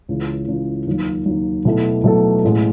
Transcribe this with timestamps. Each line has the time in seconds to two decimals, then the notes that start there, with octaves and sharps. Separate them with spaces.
0.09 C#2 C#3 E3
0.48 C#2 C#3 E3
0.87 D#2 D#3 F#3
1.26 D#2 D#3 F#3
1.65 B2 F#3 A3 E4 A4
2.04 B2 F#3 A3 E4 A4
2.44 A1 A2 G#3